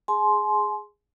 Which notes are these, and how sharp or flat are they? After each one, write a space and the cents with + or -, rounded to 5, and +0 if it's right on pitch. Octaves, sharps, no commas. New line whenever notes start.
G#4 -5 G#5 +40 C6 +0